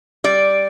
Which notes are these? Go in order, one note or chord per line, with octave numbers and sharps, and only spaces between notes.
G3 D5